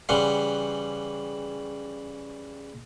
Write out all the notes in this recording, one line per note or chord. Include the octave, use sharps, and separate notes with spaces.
C#3 E3 G3 F#5 C6